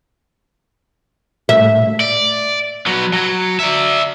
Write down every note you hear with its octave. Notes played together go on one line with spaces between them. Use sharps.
A2 A3 E5
D5
F#3 B3
F#3
D5 E5